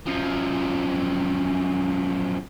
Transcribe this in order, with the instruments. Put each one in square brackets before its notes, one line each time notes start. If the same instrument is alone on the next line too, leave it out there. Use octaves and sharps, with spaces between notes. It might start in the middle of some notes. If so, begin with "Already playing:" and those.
[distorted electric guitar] F#2 F3